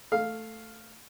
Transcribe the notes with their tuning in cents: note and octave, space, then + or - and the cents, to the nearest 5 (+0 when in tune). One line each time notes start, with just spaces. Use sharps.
A3 +5 F5 +0